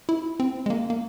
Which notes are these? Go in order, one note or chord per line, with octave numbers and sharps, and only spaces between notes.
E4
C4
G#3
A#3
A#3